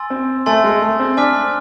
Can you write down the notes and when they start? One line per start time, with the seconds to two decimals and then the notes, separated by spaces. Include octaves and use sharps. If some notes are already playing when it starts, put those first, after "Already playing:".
Already playing: G#5 C6 E6 A6
0.10 C4
0.46 A3 G#5 C6 E6 A6
0.64 G#3
0.82 A3
0.99 C4
1.17 D4 G#5 D6 F6 B6